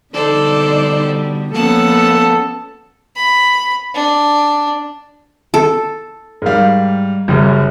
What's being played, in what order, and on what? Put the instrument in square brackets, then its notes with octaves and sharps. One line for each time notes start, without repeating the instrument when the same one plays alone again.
[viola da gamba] B2 D3 G3 [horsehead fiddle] D#4 D5 [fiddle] A4 C5
[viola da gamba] F3 B3 C#4 [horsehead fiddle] A#3 [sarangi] A4 [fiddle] F#5 A5
[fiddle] B5
D4
[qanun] A4
[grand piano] G#2 G3 [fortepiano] A#4 F5
[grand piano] F#1 F#2 [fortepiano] G3